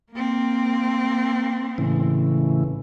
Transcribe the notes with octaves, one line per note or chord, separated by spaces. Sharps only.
A#3 C4
A2 C#3 E3